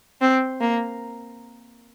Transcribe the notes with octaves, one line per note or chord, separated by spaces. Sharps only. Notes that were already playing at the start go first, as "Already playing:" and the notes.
C4
A#3